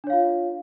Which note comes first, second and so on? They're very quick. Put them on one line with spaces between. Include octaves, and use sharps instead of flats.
D4 C#5 F5 F4